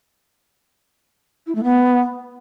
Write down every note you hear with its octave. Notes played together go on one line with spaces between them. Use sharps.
E4
A3
B3